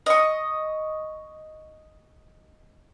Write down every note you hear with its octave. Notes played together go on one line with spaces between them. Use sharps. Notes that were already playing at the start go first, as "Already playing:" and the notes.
D#5 C#6